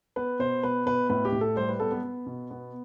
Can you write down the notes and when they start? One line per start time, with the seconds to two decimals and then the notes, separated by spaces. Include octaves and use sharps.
0.16 B3 B4
0.39 B2 C5
0.63 B3 B4
0.86 B2 B4
1.10 A2 B4
1.25 G4
1.32 A2
1.41 A4
1.56 G3 C5
1.69 B4
1.80 B3 A4
1.92 B3
2.03 B3
2.26 B2
2.51 B3